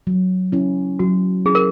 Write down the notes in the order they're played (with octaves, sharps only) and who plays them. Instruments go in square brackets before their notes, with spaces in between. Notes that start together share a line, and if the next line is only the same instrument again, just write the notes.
[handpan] F#3
C#4 E4
[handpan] F#3 [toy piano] F#4
[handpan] C#4 E4 [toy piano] G#4
[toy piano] A#4